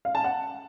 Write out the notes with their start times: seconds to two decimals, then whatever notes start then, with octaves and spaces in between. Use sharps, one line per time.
0.05 F5
0.15 A5
0.24 F#5